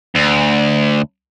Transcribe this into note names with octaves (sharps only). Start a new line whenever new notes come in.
D2